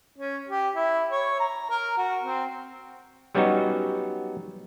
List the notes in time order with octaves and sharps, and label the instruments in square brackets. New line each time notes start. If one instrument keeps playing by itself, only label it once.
[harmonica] C#4
G4
E4
C#5
A#5
A#4
F#4
C4
[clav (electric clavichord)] F#3 G3 B3 C#4 D#4 F#4